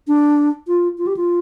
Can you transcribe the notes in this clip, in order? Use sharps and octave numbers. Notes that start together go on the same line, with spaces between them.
D4
F4
F4
G4
F4